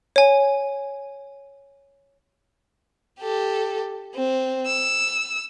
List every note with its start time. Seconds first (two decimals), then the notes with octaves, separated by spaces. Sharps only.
0.16 C#5 G#5
3.20 G4 A4
4.14 C4
4.67 E6